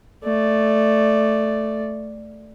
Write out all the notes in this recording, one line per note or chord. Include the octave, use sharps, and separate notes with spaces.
A3 D5